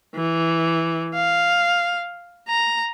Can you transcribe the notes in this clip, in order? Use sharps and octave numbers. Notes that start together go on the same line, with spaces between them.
E3
F5
A#5